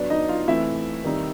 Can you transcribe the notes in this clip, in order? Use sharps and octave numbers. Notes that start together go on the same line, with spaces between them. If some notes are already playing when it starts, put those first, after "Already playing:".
Already playing: F#3 B3 D4 D5
D#4 D#5
F4 F5
E3 A3 C4 E4 E5
D#3 G3 C4 D#4